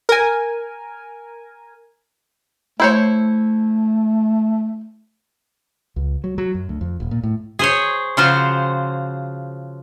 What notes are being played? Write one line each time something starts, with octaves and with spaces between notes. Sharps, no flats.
A#4 G#5
A3 E4 C5 C#5
C#2
F#3
F#3
F#2
D2
F2
D#1
A#2
A2
G#4 C5 C#5
C#3 F3 F4 F#4 C5